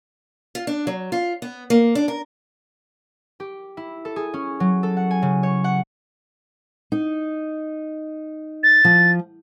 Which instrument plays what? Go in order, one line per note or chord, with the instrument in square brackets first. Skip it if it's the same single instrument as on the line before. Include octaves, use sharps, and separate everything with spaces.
[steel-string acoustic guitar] F4
D4
F#3
F4
B3
A#3
D4
A#4
[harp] G4
E4
A4
G#4
C#4
F#3
A4
F#5
G#5
C#3
C#5
F#5
[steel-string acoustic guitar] D#4
[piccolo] A6
[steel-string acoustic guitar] F3